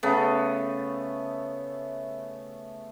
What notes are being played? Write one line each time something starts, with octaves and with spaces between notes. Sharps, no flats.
C#3 A3 B3